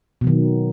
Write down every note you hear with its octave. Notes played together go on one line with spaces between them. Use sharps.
B2 D#3 F#3